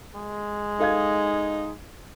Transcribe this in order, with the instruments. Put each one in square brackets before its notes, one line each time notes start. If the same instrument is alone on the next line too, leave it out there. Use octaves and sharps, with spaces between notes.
[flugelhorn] G#3
[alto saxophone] D#4 [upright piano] A4 F5 G#6